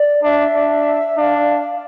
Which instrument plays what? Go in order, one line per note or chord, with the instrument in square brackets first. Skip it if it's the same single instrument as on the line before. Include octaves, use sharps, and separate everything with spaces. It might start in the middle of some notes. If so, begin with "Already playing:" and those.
Already playing: [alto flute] D5
[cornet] D4 [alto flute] E5
[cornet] D4
[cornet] D4 [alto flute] F5